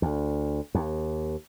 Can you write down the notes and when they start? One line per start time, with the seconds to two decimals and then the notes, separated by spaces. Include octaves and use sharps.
0.02 D2
0.75 D#2